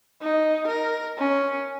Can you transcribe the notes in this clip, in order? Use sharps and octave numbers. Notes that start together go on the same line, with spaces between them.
D#4
A#4
C#4